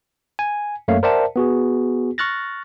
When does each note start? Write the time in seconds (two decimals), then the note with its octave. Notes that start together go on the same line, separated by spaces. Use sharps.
0.39 G#5
0.88 F#2 A3 A#3 C#5 F5
1.03 A#4 C5 D5 E5 F#5 A5
1.36 B3 F#4 G#4
2.18 C#6 F6 F#6 A6 A#6